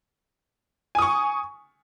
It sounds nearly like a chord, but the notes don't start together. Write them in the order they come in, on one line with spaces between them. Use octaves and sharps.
G#5 D#6 C#6